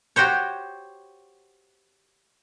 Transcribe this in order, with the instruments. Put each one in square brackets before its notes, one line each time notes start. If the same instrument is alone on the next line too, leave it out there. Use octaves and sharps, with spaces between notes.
[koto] F#4 G4 C5 C#5